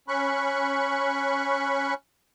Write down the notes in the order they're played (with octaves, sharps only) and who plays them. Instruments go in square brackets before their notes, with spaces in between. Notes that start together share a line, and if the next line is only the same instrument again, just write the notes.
[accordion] C#4 B5 C#6 F#6